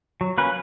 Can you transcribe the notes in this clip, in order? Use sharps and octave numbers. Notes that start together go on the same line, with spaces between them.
F#3
A#3 C#4 B4